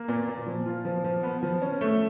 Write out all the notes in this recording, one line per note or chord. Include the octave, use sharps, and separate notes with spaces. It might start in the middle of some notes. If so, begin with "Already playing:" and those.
Already playing: A#3
A#2
A#2
F3
F4
F3
F3
B3
F3
C#4
A3